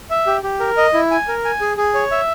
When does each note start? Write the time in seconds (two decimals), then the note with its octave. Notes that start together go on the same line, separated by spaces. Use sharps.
0.10 E5
0.26 G4
0.43 G4
0.60 A#4
0.77 D#5
0.94 E4
1.11 G#5
1.28 A#4
1.45 G#5
1.61 G#4
1.77 G#4
1.94 C#5
2.11 E5